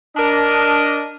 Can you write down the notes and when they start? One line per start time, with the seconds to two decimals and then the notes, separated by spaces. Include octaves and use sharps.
0.16 D4 A#4 D#5